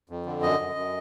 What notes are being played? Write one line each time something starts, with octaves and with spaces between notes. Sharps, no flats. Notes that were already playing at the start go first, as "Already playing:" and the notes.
F2
D3
F#2 D#5
F#2
F#2